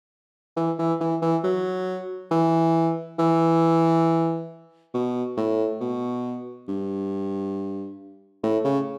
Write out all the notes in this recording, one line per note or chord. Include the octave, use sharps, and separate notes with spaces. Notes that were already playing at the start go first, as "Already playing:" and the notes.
E3
E3
E3
E3
F#3
E3
E3
B2
A2
B2
G2
A2
C#3